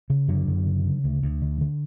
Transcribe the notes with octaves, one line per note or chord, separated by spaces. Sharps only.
C#3
F#2 D3 F#3
F#2
C#3
C#3
D2
D2
D3
D3